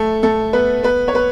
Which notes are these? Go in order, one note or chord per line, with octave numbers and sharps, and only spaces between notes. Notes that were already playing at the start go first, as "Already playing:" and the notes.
Already playing: A3 A4
A3 A4
B3 B4
B3 B4
C#5
B3 B4